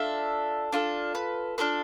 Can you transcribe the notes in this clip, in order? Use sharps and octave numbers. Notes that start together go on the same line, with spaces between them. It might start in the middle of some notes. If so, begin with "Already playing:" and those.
Already playing: D4 F4 A4 E5
D4 F4 A4
B4
D4 F4 A4 B4